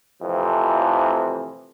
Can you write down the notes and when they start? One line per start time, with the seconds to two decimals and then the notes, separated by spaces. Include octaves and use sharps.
0.22 F2 A2 C3 E3 F3